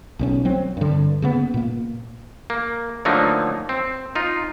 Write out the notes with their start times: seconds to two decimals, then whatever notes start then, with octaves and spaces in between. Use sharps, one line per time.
0.19 B1 E3 C#4
0.45 F#3 C4
0.77 G2 D3
1.22 C#3 A#3 B3
1.54 A#2 A#3
2.50 A#3
3.05 D3 F3 F#3 A3 A#3 D#4
3.69 C4
4.15 D#4 F4